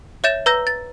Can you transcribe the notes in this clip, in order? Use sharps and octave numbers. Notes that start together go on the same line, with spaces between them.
C#5 E5 G6 A6 E7
B4 A#5 E6 G6 A#6 G7
A6